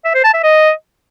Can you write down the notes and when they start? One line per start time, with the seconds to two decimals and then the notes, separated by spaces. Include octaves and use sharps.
0.05 E5
0.15 C5
0.24 A5
0.34 E5
0.44 D#5